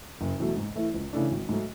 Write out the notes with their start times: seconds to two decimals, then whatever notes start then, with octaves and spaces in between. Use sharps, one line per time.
0.21 F#1
0.39 E2 B2 F#3 A3
0.57 G#2
0.75 E3 A3 E4
0.94 C#2
1.13 C#3 E3 A3 D4
1.31 G#1
1.49 G#2 F#3 A3